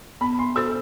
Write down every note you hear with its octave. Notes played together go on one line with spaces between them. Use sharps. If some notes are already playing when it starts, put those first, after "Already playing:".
B3 B5
C6
F#4 A4 C5 E6